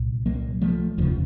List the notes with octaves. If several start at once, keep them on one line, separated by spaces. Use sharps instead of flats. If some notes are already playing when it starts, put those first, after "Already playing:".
Already playing: C2 A#2
F#3 A#3
F3 A3
F1 D#2 C#3 F3